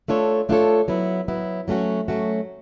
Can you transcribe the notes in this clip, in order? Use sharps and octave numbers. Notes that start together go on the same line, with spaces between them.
A3 D4 F4 A4 C#5
A3 D4 F4 A4 C#5
F#3 B3 E4
F#3 B3 E4
F#3 A3 C#4 F#4
F#3 A3 C#4 F#4